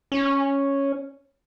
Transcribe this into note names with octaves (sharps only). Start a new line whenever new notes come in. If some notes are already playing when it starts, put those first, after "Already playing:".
C#4